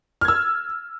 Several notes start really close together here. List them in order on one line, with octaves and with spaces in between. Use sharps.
F6 G#6 E6